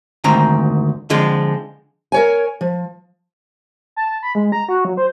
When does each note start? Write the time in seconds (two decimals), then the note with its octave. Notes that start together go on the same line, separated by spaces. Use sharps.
0.24 D2 G#2 D#3 C4 A#5
1.10 D3 F3 G#3 C4
2.12 A#4 C#5 G#5
2.61 F3
3.96 A5
4.23 B5
4.35 G#3
4.52 A#5
4.69 F#4
4.85 F#3
4.97 C5